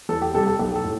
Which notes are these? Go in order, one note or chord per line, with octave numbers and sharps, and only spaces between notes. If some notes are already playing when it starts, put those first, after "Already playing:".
E2 A4
G4
C3 G3 A4
A4
B1 G4
A4
A2